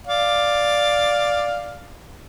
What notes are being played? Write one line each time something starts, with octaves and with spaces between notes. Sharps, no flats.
D5 F5